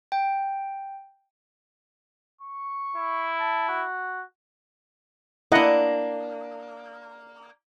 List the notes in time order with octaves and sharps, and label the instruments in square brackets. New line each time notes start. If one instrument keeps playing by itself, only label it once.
[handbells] G5
[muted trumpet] C#6
[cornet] E4
[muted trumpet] A5
F#4
[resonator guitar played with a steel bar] A#3 D4 [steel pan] E4 D#5 F#5